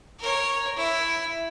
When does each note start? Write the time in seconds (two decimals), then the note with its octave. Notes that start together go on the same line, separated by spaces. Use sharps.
0.19 A#4 C#5
0.76 E4